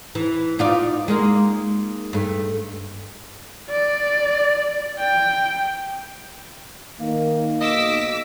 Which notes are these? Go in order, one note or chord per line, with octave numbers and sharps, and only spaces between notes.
E3
D#4 F4 D5
G#3 A#3 D#4
G2 A3
D5
G5
D#3 A#3
B1 D#5 D6 E6 B6